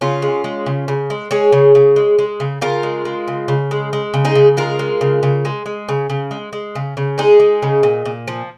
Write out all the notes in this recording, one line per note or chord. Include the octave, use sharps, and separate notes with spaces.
C#3 C#4 F4
G#3
G#3
C#3
C#3
G#3
G#3 G#4 C#5
C#3
C#3
G#3
G#3
C#3
C#3 F4 A#4
G#3
G#3
C#3
C#3
G#3
G#3
C#3
D#4 G#4
C#3
G#3 F4 A#4
G#3
C#3
C#3
G#3
G#3
C#3
C#3
G#3
G#3
C#3
C#3
G#3 D#4 G#4
G#3
C#3
A#2
A#2
F3